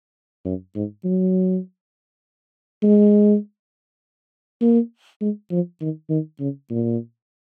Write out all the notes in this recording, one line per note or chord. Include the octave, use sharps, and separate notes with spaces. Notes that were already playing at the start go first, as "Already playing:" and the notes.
F#2
G#2
F#3
G#3
A#3
G#3
F3
D#3
D#3
C#3
A#2